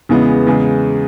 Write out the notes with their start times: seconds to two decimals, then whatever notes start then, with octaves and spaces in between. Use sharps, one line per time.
0.09 E2 C#3 E3 G#3 B3
0.47 E2 C#3 G#3